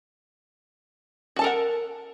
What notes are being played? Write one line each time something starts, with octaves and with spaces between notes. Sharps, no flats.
F#4 A4 A#4 F#5 A5